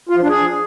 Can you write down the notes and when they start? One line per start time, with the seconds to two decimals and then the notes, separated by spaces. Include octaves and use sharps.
0.09 F4
0.16 F3
0.22 D4
0.29 G#4